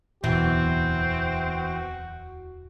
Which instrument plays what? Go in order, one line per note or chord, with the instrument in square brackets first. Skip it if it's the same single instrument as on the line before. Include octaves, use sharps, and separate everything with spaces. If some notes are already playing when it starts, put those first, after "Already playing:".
[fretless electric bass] D1 E2 B2 [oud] E3 [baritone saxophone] C4 [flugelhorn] F#4